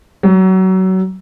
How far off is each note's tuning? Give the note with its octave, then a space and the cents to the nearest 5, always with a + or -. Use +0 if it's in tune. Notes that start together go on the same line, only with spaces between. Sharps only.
F#3 +25